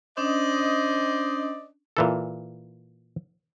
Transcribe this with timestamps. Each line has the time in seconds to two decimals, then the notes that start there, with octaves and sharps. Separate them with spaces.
0.18 C#4 D4 C5 D5 D#5
1.97 A#2 E3 A4